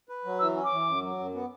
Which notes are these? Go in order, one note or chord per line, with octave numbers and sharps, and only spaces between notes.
B4
F#3
E3 E6
C#4
D6
E3
F#2
F#3
F#2
B3